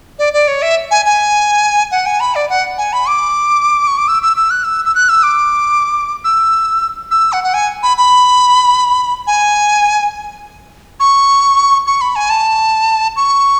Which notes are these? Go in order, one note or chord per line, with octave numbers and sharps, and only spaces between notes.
D5
D5
C#5
E5
G#5
G#5
F#5
G#5
B5
D5
F#5
G#5
B5
D6
C#6
D6
E6
E6
E6
F#6
E6
E6
F#6
E6
D6
E6
E6
F#5
F#5
G#5
B5
B5
G#5
C#6
C#6
B5
G#5
A5
C#6